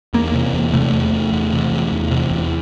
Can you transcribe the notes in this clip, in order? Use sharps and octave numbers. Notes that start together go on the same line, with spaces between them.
E2 A#3
C3
E2
C3 A3
E2
E2
E2
C3
E2
E2
C3
E2